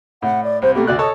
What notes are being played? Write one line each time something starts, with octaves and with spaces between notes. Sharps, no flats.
A2 F#5
D5
C2 C5
B2 A3 A#3 G4
D2 F#4 D5 F#6
A4 C#5 D#5 A5